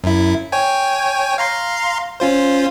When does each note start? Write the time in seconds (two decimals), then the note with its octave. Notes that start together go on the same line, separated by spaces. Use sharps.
0.04 F#2 E4
0.52 C#5 G5 G#5
1.38 F5 A#5 C6
2.20 C#4 F4 C5